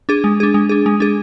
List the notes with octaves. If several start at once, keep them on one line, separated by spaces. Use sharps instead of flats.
D4 G#4
G#3
D4 G#4
G#3
D4 G#4
G#3
D4 G#4